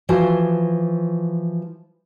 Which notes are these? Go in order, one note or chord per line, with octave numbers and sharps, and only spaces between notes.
E3 F3 F#4 C5